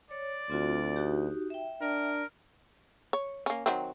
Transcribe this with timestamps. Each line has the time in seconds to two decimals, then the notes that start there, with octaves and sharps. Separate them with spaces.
0.11 C#5 D5
0.50 D2 C4 F4 F#4
0.96 D#4 F#4 G4
1.50 E5 G5
1.81 D4 A#4
3.13 C#5
3.46 A#3 C#4
3.66 D#3 F#3 C4